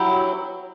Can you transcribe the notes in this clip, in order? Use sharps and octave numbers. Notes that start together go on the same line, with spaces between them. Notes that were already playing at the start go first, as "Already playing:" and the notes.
Already playing: F#3 E4 G4